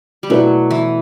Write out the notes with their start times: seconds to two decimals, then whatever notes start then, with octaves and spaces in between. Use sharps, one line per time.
0.23 G3
0.29 B2 F#3 A3 E4 B4 D5
0.71 E3